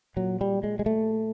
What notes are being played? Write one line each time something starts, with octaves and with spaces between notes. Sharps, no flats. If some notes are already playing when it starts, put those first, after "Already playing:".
A#2 F#3
G3
G#3
G#3
A3